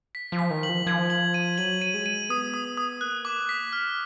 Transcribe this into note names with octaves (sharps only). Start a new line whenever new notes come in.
B6
F3
B6
D#3
F#7
F3
F3 G#6
F#7
D#7
F#3 F#7
D#7
G#3
D#7
B3 D#6
D#6
D#6
A#3 F#6
D6
B6
F6